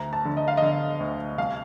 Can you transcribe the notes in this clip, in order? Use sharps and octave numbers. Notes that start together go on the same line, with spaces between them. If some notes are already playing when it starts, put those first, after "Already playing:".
Already playing: D2 A#5
A5
D3
D#5
F5
D3 D#5
D2
C2 F5